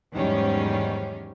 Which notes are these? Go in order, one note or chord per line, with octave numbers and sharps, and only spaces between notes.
E2 G#2 D#3 F#3 G3 C#4